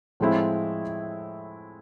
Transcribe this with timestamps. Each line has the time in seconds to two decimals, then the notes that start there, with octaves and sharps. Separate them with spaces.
0.20 A2 F3 G#3 C4 E4